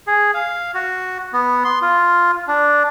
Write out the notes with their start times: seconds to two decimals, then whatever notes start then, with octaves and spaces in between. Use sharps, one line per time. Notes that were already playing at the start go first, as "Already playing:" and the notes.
0.07 G#4
0.34 F5
0.74 F#4
1.33 B3
1.64 C6
1.82 F4
2.48 D4